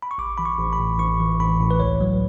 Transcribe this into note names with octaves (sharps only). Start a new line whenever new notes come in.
B5
C#6
A1 D6
E3 B5
C#6
A1
B5
A2
A1 C#6
E3
A1 B5
A2
B4
C#2 C#5
F#3